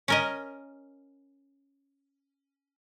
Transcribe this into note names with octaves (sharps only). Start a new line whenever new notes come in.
C#4 A#4 D#5